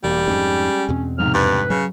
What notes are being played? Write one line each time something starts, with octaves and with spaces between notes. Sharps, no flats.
E1 G3 A#3
F2 G#2 G#3 C#4
E2 B2 C4
F2 G#2 C3 F6
G2 B4
C#3 F#3